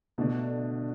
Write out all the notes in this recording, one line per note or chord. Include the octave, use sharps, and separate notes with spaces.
B2 D3 A3 D4